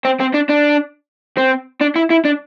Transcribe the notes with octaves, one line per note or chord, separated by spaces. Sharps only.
C4
C4
D4
D4
C4
D4
E4
E4
D4